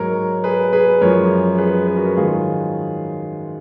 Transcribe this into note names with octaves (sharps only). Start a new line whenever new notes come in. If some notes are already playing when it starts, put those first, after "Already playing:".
Already playing: G#2 F#3 A#4 C#5
G#4 B4
G#4 B4
F#2 F3 G#3 A#4 C#5
G#4 B4
B4
F#4 A#4
G#2 D#3 F#3 F4 G#4